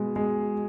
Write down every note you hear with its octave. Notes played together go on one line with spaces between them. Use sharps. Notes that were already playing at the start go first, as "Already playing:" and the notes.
Already playing: B2 G#3
G#3